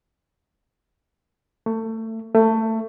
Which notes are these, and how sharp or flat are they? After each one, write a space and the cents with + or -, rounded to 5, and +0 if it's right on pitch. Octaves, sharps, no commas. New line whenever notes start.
A3 +25
A3 +20